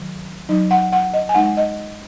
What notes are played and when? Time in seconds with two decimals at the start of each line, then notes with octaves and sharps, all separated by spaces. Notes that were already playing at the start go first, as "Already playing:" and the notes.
Already playing: D#3 F#3
0.49 F#3 D#4
0.71 F#5
0.93 F#5
1.14 D#5
1.29 G#5
1.35 G#3 D#4 F#5
1.57 D#5